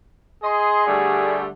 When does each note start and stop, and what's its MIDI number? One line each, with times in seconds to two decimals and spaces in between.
0.44 1.43 68
0.44 0.84 75
0.44 0.84 84
0.86 1.48 50
0.86 1.48 55
0.86 1.48 57